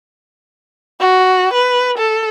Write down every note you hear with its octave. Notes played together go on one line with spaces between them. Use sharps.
F#4
B4
A4